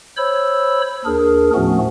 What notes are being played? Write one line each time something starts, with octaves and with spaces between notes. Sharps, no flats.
C5 C#5 B5 E6
D#2 D4 G#4 A#4
A2 F3 A3 B3 C#4 F#4